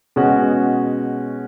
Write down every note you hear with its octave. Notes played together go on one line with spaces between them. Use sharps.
B2 G#3 C#4 F#4